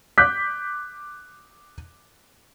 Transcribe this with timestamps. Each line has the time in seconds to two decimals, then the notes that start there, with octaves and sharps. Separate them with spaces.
0.18 D6 F#6 G6 B6